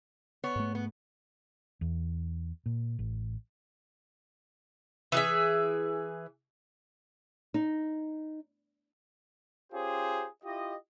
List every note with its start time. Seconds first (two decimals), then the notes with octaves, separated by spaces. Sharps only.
0.44 B3 C#5
0.56 G#2 A3
0.75 B3
1.81 E2
2.66 A#2
2.99 A1
5.12 E3 G#4 E5
7.54 D#4
9.73 C#4 F4 G4 G#4 C5
10.44 E4 F4 G4 D#5